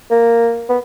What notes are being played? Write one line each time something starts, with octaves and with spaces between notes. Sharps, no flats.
A#3
B3